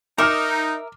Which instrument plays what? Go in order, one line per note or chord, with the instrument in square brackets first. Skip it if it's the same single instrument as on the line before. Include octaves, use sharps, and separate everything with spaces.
[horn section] D#4 [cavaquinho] A#4 E5 [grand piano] D6 F6